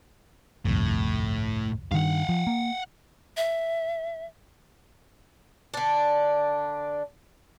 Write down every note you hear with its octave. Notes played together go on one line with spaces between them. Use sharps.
G1 C2 F2 A2
G2 D#3 F5 F#5
F3
A#3
E5
D3 D4